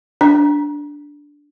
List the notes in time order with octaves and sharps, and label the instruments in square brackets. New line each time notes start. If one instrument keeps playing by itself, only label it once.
[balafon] D4